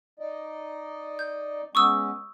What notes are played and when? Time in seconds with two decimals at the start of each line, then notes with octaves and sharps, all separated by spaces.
0.19 D#4 D5 D#5
1.19 G6
1.75 G#3 B3 C#4 C#6 D#6 E6